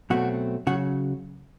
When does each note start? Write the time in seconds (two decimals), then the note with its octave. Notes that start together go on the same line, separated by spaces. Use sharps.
0.10 B2 F#3 A3 C4 F#4
0.67 C#3 F#3 F#4